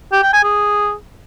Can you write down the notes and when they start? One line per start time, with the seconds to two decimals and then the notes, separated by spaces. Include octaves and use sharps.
0.12 G4
0.23 G5
0.33 G#5
0.44 G#4